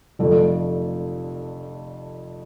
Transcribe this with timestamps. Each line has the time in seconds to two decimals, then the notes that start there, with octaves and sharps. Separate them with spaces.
0.19 F1 F2 D3 F3 A3